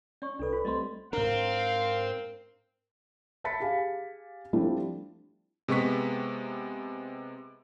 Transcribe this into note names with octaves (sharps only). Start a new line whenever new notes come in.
C#4 D5 C#6
C2 D4 A4 B4 D5
F4 C5
G3 A3 C4 D#5 C6
G#2 C4 D4 A#4 F5
E5 A5 B5 A6 B6 C#7
G4 G#4 F5 G#5
F3 G3 A3 C4 D4 E4
C3 G#3 B3 C#6 B6